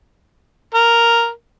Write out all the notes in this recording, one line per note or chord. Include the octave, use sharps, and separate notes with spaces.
A#4